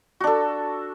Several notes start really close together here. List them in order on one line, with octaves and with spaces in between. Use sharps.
F#4 D4 A4